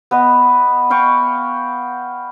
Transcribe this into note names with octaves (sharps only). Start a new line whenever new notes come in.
B3 B4 D#5
D#5 F5 G5 C#6